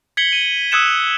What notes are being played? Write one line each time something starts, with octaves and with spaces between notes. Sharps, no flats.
G#6 B6 C#7 F#7 G7
D#7
D#6 E6 F#6 G#6 C#7 E7